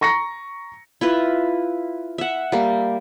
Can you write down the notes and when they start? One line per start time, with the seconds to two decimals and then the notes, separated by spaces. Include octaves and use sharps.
0.01 A#5 C#6 A#6 C#7
1.01 E4 F4 B4
2.18 E5 F#5
2.52 G3 A#3